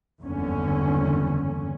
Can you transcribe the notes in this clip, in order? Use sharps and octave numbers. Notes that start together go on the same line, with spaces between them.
F#1 E2 G2 D3 C#4